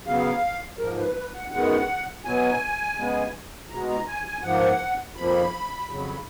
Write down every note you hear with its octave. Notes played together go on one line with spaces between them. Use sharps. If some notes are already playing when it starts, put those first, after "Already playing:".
C#3 F#3 B3 F5
G#2 F3 A#3 A#4
B4
B4
F#5
F#2 D#3 G#3 B3 F#5
B2 F#3 B3 G#5
C#3 G#3 B3
B2 G#3 B3 A#5
A#5
G#5
G#5
G#2 F3 A#3 F#5
F2 F3 A#3 B5
F2 C#3 F#3